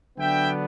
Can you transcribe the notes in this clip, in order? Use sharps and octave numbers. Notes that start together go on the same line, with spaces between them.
D3 F#3 B3 D4 E5 G5